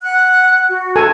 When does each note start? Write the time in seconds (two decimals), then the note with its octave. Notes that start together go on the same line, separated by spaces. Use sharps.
0.03 F#5 F#6
0.69 F#4
0.96 A4 G#5